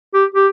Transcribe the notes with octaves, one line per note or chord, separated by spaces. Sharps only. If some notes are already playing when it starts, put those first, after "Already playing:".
G4
G4